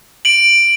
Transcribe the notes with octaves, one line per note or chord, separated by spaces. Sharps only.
D7 F#7